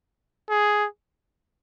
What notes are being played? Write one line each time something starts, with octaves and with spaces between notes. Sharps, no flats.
G#4